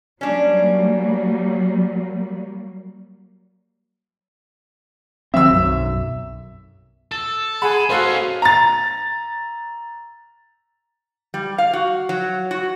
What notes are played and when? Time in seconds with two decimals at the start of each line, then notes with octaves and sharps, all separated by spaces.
0.21 F#3 G3 A#3 C#4 D4
5.34 D#3 F#3 C4 E5 E6
5.50 B1 F#2
7.12 A4 A6
7.62 G#4 F#5 B5
7.90 C#4 D#4 F#4 A4 C5 F5
8.42 A#5 A6
11.34 G3
11.58 F5
11.73 F#4
12.09 F#3
12.51 F#4